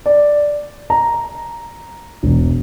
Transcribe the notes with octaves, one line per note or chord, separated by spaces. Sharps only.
D5
A#5
E1